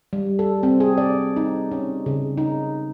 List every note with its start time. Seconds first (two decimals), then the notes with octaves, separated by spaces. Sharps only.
0.13 G3
0.39 A4
0.63 C4
0.80 G#4
0.98 D5
1.36 D#4
1.71 C#4
2.06 C#3
2.38 D#4